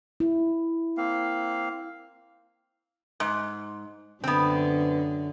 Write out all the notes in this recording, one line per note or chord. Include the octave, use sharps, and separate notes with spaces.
E4
A#3 C4 F5
G#2
F#2 D3 B3 C4